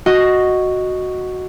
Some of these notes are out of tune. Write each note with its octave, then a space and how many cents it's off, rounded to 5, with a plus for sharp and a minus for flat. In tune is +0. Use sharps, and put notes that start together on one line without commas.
F#4 +0 D#5 +0